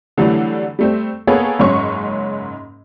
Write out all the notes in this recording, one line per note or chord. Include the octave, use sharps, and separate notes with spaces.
D3 E3 F#3 G3 A3 D4
G3 A3 C4
A#3 B3 G#4 A4 B4 C#5
F#1 G#2 F#3 C#4 C#6